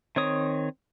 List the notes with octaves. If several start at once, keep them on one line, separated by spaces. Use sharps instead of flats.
D#3 C4 C#5 D#6